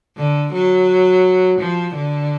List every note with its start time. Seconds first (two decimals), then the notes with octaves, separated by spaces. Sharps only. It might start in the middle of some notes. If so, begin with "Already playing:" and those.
0.17 D3
0.53 F#3
1.59 F3
1.95 D3